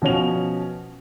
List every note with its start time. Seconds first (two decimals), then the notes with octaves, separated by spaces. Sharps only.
0.02 B2 F3 C#4 C#5 F7